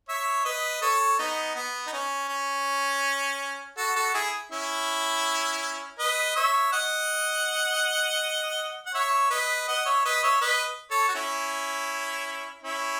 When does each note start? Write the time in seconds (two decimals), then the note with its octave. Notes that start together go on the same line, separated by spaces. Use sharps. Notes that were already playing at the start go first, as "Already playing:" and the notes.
0.09 C#5 E5
0.45 B4 D#5
0.82 A4 C#5
1.19 B3 D#4
1.56 B3
1.87 D#4
1.93 C#4
2.29 C#4
3.77 F#4 A4
3.96 F#4 A4
4.14 E4 G#4
4.51 C#4 E4
5.99 B4 D#5
6.36 C#5 E5
6.72 D#5 F#5
8.86 F#5
8.94 C#5 E5
9.31 B4 D#5
9.68 D#5 F#5
9.86 C#5 E5
10.05 B4 D#5
10.23 C#5 E5
10.41 B4 D#5
10.91 A4 C#5
11.09 F#4
11.15 C#4 E4
12.63 C#4 E4